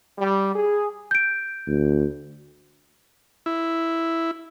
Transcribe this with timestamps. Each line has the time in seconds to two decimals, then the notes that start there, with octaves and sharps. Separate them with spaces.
0.17 G3
0.54 G#4
1.11 G6 D7
1.67 D2
3.46 E4